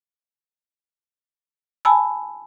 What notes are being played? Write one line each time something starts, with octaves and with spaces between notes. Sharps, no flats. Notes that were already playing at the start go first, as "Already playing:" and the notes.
G#5 A5 B5 E6